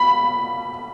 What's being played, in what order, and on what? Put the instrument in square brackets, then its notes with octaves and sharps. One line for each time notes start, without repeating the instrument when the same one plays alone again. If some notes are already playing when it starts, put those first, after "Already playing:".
Already playing: [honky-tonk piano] B5